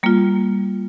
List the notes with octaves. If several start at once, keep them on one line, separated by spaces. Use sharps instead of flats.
G3 A#3 F4